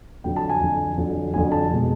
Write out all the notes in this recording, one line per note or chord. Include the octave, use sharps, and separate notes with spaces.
F2 D3 F#3 G5
A5
G#5
F2 D3 F#3
F2 D3 F#3
F2 D3 F#3 G#5
A5
B2 G#3